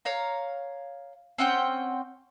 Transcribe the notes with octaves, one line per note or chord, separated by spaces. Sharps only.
C#5 F5 A#5
C4 C#4 F#5 G5